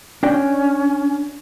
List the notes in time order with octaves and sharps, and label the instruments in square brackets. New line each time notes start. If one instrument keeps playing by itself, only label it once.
[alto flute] C#4 [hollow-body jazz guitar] D4 G5